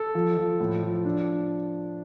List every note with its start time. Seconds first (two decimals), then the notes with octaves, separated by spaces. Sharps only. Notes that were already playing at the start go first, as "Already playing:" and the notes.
Already playing: A4
0.15 F3
0.37 F3
0.60 A2
0.83 F3
1.05 D4